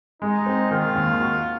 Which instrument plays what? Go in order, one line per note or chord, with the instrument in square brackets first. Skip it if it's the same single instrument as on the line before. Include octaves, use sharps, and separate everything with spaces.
[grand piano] G#3 [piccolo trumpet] D#4
[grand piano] C4
[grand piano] D#3 [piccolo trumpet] F4
[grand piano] D#2
F#4